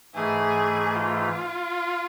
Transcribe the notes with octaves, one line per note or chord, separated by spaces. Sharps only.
G#2 E3 A3 G#4
F4